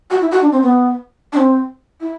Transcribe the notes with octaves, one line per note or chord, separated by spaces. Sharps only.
F#4
E4
F#4
D4
C4
B3
D4
C4
E4